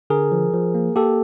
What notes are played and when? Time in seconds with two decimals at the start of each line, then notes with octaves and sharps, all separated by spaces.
0.10 D3 G#4 A#4
0.32 F3
0.53 F3
0.75 A#3
0.96 A#3 G4 A4